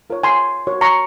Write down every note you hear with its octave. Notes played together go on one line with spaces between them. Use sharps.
F4 A#4 C#5
G#5 C6
F#4 A#4 C#5
A#5 C#6